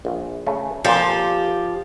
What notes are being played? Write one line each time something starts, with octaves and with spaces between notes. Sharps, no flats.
A#1
C#3 A3
F2 A#2 F3 G4